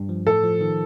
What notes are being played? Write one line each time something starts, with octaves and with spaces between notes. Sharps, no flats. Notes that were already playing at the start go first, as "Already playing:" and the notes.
Already playing: G2 G3
F3
A2 A4
F3
D#3